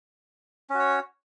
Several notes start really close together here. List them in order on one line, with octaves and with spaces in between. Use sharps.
C#4 F#4 C#5